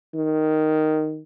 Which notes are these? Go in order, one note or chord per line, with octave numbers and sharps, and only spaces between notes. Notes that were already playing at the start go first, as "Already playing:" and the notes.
D#3